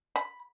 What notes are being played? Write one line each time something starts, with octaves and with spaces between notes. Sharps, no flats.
B5